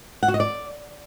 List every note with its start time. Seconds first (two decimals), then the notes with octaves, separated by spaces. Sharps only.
0.23 F#5
0.28 F#4
0.34 D#5
0.40 D5